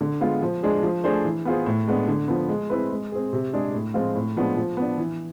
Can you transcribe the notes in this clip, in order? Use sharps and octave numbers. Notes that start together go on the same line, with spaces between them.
D3
G#3 B3 F4
F3
G#3 D4 G#4
F3
A3 D4 G#4 C5
E3
B3 F4 G#4 C5
A2
G#3 B3 D4
D3
F3 B3
G#3
C4 E4 B4
G#3
C4 G#4
C3
G#3 D4 G#4
A2
F3 G#3 C4 F4
A2
F3 G#3 B3 D4
F3
B3 D4
E3